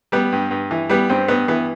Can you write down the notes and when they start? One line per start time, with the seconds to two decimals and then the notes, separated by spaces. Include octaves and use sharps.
0.12 G3 B3
0.32 G2
0.51 G2
0.71 E3
0.90 G3 B3
1.09 G2 C4
1.28 G2 B3
1.48 E3 B3